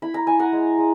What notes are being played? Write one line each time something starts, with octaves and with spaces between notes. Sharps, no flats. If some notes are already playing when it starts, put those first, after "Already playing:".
E4 B5
A#5
E4 G#5
F#5 A#5
G#3
G#3